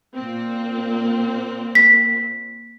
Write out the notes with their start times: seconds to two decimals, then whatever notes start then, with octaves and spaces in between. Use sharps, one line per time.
0.14 A#2 A#3 C4
1.75 B6